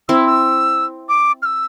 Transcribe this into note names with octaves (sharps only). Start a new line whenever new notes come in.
C4 E4 E6
E6
D6
F6
E6